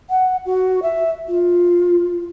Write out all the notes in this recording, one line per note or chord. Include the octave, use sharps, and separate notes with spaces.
F#5
F#4
E5
F4